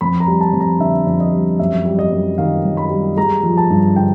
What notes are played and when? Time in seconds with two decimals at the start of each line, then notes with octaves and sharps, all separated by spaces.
0.01 F2 B5
0.20 A#5
0.28 G3
0.41 A5
0.53 F2
0.60 A#5
0.79 D3 E5
1.07 F2
1.20 D#5
1.32 G3
1.59 F#2 E5
1.85 G3
1.99 D#5
2.12 F#2
2.38 D#3 F5
2.65 F#2
2.77 B5
2.90 G3
3.17 G#3 A#5
3.43 F3
3.57 A5
3.70 G2
3.96 D3 G5